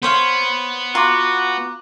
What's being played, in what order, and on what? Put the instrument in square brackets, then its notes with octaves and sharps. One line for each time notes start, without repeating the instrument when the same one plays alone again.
[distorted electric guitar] B3 [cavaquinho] C5 C#5 F5
[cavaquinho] F4 [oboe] F#4 [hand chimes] A#5 D6